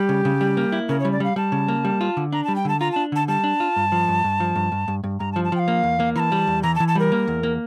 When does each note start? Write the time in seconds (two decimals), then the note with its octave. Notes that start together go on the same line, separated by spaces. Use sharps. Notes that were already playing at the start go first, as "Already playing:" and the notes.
Already playing: G3 G4
0.09 C#3
0.25 C#3
0.41 G3
0.57 A#3
0.72 E4
0.89 C#3 A#4
1.00 G3 C#5
1.12 D5
1.20 G3 F5
1.36 G3 A5
1.52 C#3
1.68 A#3
1.85 G3
2.01 F4
2.17 D3
2.32 D4 A#5
2.44 G3 A5
2.56 G5
2.65 D3 A5
2.80 F4 A#5
2.92 D4 A5
3.12 D3 A5
3.28 G3 A5
3.44 D4
3.60 F4
3.76 G2
3.92 F3
4.09 G2
4.24 G2
4.40 F3
4.56 G2
4.72 G2
4.88 G2
5.04 G2
5.19 G2 A#5
5.32 A5
5.36 F3
5.44 A5
5.52 F3 G5
5.59 F5
5.68 A#3
5.83 E2
6.00 A#3
6.16 E3 A#5
6.20 A5
6.32 G3
6.47 E2
6.63 E3 A#5
6.75 A5
6.80 E3
6.88 A5
6.95 G3 A#4
7.12 A#3
7.28 E2
7.43 A#3